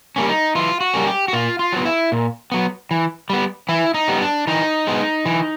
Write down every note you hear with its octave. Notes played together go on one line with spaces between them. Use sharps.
G3 A#3 C#4
D#4
E3 F4
F#4
G3 A#3 C#4
G4
F#4
A#2 F4
F4
F#3 B3
E4
A#2
F#3 B3
E3
G3 B3
E3 E4
D#4
G3 B3
D4
E3 D#4
G#3 B3
E3